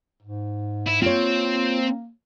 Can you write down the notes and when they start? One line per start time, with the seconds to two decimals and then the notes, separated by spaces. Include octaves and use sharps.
0.23 G#2
0.87 E4
1.02 A#3 C4 F4 C#5